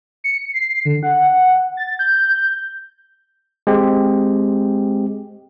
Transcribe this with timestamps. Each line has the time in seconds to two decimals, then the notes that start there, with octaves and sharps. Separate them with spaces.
0.24 C#7
0.54 C7
0.85 D3
1.03 F#5
1.77 A6
1.99 G6
3.67 G#3 C4 G4